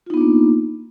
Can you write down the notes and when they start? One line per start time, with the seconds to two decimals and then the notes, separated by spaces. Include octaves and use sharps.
0.06 F4
0.10 D#4
0.14 B3
0.17 D4
0.21 A#3